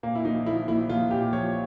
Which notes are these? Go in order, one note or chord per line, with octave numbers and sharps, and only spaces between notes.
A#2 A#3
E4
A#1 D#4
A#1 E4
A#1 E4
A#1 F4
A#2 G4
F3 C#5